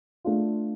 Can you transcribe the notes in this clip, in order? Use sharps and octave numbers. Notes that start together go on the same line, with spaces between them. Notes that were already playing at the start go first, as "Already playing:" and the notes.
A3 D4 F4